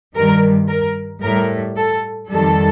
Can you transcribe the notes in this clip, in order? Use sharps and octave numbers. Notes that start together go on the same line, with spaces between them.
G2 D#3 G3 A#4
A#4
A2 G3 A#4
A4
F2 D#3 G3 A4